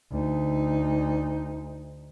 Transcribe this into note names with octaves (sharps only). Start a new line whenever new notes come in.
D2 D#4